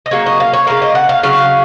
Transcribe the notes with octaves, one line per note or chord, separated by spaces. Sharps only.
D#5
C#3 F#3 A#3 C#5
D#5
F5
C#5
C#3 F#3 A#3 F5
D#5
F#5
F5
C#3 F#3 F5